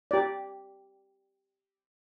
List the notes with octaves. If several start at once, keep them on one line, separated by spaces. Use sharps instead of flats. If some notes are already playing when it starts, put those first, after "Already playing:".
G4 D5